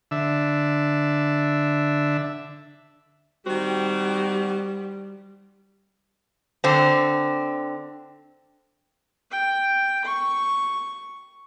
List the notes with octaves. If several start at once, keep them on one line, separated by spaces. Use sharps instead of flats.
D3 E5
D#3 G3 C4 F#4
D3 C4
G5
C#6